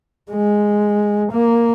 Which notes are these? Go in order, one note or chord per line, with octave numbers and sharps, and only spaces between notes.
G#3
A#3